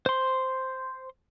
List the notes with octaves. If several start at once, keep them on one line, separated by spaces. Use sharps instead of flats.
C5 C6